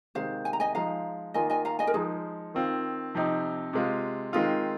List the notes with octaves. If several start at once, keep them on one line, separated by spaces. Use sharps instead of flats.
C3 D#3 G#3 C5 F5
G#5
A#5
D#5 G#5
F3 G#3 D#4 F5 A#5
D#3 A#3 F4 D#5 G#5
D#5 G#5
F5 A#5
D#5 G#5
A#4
F3 G#3 D#4 G#4
D#3 C4 F4
C3 F3 C4 D#4
C3 G#3 F4
D#3 G#3 C4 D#4 F4